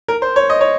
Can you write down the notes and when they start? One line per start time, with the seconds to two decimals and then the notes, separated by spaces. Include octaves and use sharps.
0.08 A#4
0.22 C5
0.36 C#5
0.50 D#5
0.61 C#5